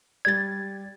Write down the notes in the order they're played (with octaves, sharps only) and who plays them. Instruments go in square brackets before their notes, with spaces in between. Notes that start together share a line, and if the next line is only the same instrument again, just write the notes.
[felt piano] G3 D5 [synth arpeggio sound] G#6 A6